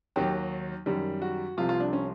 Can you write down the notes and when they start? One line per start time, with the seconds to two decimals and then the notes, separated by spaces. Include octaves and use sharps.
0.16 D#2 D#3 F#3 G4
0.86 F#2 D#3 G3
1.22 F#4
1.57 C2 C3 F3 F4
1.69 F4
1.80 D4
1.93 C#4